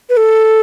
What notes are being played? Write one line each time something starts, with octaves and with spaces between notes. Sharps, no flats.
B4
A4